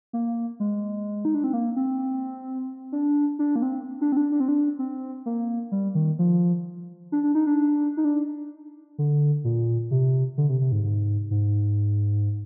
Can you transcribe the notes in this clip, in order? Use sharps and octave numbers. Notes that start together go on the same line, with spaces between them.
A#3
G#3
D#4
D4
C4
A#3
C4
D4
D4
A#3
C4
D4
C4
D4
D4
C4
D4
C4
A#3
G3
D#3
F3
D4
D4
D#4
D4
D#4
D4
D3
A#2
C3
D3
C3
C3
G#2
G#2
G#2